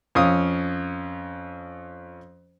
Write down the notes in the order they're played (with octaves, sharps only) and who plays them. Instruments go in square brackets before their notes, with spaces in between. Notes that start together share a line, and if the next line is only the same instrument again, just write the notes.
[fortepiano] F2 C#4 F5 D#6